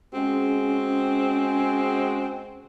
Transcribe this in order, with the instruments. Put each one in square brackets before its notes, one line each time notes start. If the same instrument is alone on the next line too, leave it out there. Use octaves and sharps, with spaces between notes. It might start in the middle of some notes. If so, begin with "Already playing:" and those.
[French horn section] G#3 F#4 G#4 [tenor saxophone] C4 [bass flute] C#4